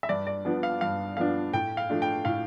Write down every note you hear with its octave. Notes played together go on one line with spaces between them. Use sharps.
E5
G2 D5
D5
F3 B3 D4
F5
G2 F5
F3 B3 D4 F5
A2 G5
F5
F3 A3 D4
G5
A2 F5